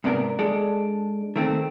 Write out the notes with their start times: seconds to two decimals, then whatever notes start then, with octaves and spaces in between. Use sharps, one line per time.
0.04 G#2 C3 B3 D4 G4 A#4
0.39 G#3 D4 A4
1.36 D#3 A3 C4